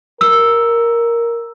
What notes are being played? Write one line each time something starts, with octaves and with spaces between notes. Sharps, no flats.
A#4 E6